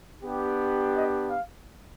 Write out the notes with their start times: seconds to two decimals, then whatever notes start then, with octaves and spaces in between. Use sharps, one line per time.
0.22 B3 D4 G4
0.94 D#5
1.30 F5